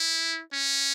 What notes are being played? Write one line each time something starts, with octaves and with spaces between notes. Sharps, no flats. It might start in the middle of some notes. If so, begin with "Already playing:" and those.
Already playing: E4
C#4